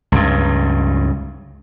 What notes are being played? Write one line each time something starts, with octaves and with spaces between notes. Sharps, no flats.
C#2 G2